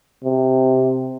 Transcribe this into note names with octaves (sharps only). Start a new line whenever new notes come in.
C3